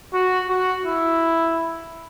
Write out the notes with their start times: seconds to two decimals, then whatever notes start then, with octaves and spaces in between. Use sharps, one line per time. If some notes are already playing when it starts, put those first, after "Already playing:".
0.13 F#4
0.49 F#4
0.86 E4